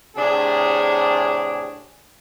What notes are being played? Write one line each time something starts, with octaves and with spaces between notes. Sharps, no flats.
A2 C3 D4 G4 G#4